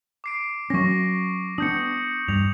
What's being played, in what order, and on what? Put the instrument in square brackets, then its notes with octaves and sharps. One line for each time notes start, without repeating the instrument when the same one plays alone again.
[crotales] D6 C7 D7
[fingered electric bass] F#3 C#4 [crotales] C#6 A#6
[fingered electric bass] B3 D4 [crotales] D#6 G6 C#7
[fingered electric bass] G2 [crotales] F7